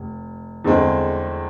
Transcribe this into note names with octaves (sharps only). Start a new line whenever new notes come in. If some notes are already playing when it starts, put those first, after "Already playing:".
Already playing: F1
E2 D3 G#3 C4